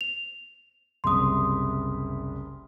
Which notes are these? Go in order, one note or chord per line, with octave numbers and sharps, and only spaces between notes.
F7
F#1 C2 C6 D#6